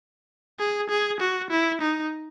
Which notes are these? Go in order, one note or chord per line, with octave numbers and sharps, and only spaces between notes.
G#4
G#4
F#4
E4
D#4